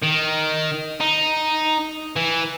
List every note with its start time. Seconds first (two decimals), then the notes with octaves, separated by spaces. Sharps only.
0.03 D#3
1.01 D#4
2.16 E3